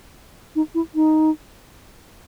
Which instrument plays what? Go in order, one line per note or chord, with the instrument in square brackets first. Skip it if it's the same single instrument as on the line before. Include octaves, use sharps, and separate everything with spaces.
[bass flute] D#4
E4
D#4